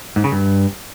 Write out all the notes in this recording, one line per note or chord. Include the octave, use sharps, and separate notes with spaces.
G#2
C#3
G2